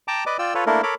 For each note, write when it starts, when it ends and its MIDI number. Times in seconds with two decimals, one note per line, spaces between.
0.08 0.24 79
0.08 0.24 81
0.08 0.24 82
0.08 0.24 86
0.26 0.37 71
0.26 0.37 74
0.26 0.37 75
0.26 0.37 86
0.39 0.54 65
0.39 0.54 74
0.39 0.54 79
0.39 0.54 88
0.55 0.65 65
0.55 0.65 69
0.55 0.65 71
0.55 0.65 73
0.66 0.82 57
0.66 0.82 58
0.66 0.82 62
0.66 0.82 64
0.66 0.82 69
0.66 0.82 70
0.83 0.95 69
0.83 0.95 70
0.83 0.95 73
0.83 0.95 83
0.83 0.95 86